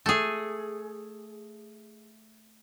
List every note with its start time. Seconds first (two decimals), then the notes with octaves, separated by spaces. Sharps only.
0.06 A3 G#4